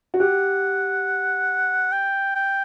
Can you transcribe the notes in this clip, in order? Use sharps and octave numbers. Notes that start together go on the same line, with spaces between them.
F#4
G4 F#5
G5
G5